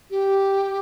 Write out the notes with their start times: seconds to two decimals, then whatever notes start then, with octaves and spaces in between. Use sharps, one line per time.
0.11 G4